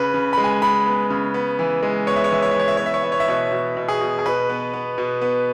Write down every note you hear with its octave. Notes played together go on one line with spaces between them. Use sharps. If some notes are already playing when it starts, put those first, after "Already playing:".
Already playing: C#3 B4
C#3
G#3 B5
G#5
G#3 B5
B3
C#3
B3
E3
G#3
B3 C#5
E5
C#5
E3 E5
C#5
E5
E3 C#5
E5
B3 C#5
E5
C#5
B3 E5
C#5
E5
B2 C#5
B2
B2
G#4
B2
G#4
B2 B4
B3
B3
B2
B3